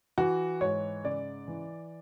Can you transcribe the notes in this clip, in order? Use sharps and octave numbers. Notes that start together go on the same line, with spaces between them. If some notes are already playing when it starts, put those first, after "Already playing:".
E3 F#4
G#2 C#5
C#3 D5
E3